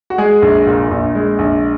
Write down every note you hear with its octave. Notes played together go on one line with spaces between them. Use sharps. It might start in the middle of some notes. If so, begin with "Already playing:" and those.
F#4
G#3 G#4
A#1
A#2
A#1
G#3
A#1